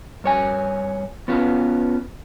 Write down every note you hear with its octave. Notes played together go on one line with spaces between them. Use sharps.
G2 C#5 G#5
B3 C#4 F4 B4